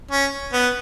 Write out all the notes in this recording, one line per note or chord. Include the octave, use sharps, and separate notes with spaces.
C#4
B3